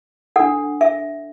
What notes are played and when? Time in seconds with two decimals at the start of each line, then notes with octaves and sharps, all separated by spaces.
0.36 D4 A4 F#5
0.81 E5